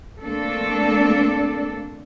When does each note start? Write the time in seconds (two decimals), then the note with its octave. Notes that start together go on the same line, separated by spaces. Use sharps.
0.22 A3 A#3 C4 D4 A4